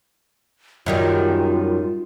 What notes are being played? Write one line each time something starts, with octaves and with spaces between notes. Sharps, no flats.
F#2 D#3 G3 F4